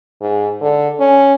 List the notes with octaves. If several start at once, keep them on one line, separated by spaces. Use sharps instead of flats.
G#2
D3
C#4